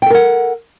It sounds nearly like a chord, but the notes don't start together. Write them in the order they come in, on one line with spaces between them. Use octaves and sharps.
G5 A4 A#4 F#5